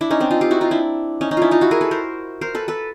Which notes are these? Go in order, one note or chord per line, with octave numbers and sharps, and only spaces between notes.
D4 E4
C#4 D#4
C4 D4
D#4 F4
F4 G4
E4 F#4
D#4 F4
D4 E4
C#4 D#4
C#4 D#4
D4 E4 F4
D#4 F4
E4 F#4
G#4 A#4
A4 B4
A#4 C5
A#4 C5
A4 B4
A4 B4